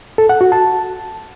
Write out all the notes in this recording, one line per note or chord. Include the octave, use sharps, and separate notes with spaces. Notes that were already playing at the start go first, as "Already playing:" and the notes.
A4
F#5
F#4
A5